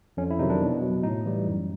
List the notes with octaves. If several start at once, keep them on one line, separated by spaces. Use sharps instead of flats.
F2 C#4
E4
C3 D#3 F#3 D#4
D4
B2
F#3
A2 D#4
E3 G3
F#2